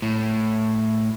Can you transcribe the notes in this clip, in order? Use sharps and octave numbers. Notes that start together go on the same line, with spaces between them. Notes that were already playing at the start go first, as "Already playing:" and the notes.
A2